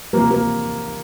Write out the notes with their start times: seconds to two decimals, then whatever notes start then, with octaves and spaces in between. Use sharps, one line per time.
0.13 C3 F3 A#3
0.31 A#3